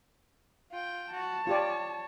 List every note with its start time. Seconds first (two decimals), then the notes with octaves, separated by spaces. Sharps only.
0.71 F4 G5
1.12 F#4 A5
1.47 F4 G4 C#5 D5